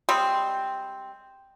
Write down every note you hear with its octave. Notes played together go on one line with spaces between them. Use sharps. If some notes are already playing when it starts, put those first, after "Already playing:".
G3 G#3 C4